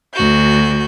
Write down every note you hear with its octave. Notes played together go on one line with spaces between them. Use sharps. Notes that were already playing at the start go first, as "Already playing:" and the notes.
D2 F#4 G6